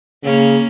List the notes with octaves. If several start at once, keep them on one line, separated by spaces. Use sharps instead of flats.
C#3 A#3 C#4